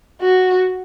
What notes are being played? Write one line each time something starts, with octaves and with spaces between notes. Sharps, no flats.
F#4